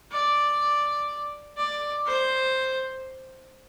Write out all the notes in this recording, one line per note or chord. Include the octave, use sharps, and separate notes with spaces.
D5
D5
C5